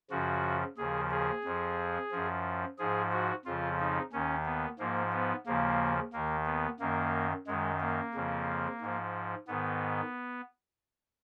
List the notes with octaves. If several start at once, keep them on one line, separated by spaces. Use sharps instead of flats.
F#2 C#3 F3 F#4
D#2 C#3 F3 G#4
G#4
F2 F3
F#2 F3
G#2 F3 G#4
F#4
F2 C#3 F3 F4
D#4
D#2 D#3 C#4
B3
G#2 F3 A#3
B3
D#2 C#3 F3 A#3
D#2 D#3 A#3
B3
F#2 D#3 A#3
F#2 D#3 G#3
A#3
F2 C#3 F3
G#2 F3
G#2 D#3 B3